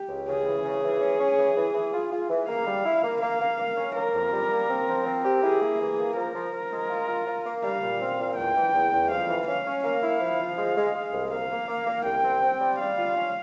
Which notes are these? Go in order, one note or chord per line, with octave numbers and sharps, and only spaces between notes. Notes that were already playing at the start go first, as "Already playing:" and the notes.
Already playing: G4
C#2
C#3 G#4
E3
C#3
E3
C#4
C#4
E3
E3
E3
F4
F4
E3
A#3 F5
G3
E4
A#3
A#3 F5
A#3
A#3
C#4
A#3 A#4
F2
G3
A#3
C4
F3
C4
G4
E4 G#4
A#3
E3
A#3
F3 A#4
F3
F3
G#3
F4
F4
F4
A#3
G3 F5
A#2
C4
A#2
E2 G5
E3
E2
E2
F2 F5
E3
C#4 F5
C#4
A#3 F5
E4
F3
F3
G#3
G#3
G#3
C2
A#3 F5
A#3
A#3
A#3
C2 G5
C4
C4
G3
G3 F5
F4
C#4